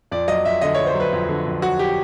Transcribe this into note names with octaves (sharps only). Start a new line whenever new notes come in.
F2 D5
F#3 D#5
F2 E5
D3 D#5
F2 C#5
C5
F#3 B4
F2
D3
F2
F#3 F#4
G4